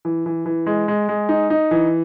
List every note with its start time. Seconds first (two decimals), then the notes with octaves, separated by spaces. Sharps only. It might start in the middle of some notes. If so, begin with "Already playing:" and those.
0.05 E3
0.26 E3
0.46 E3
0.66 G#3
0.88 G#3
1.09 G#3
1.29 D#4
1.50 D#4
1.71 E3